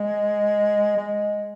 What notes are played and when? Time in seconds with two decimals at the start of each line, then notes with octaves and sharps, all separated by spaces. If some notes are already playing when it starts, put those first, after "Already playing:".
Already playing: G#3
0.97 G#3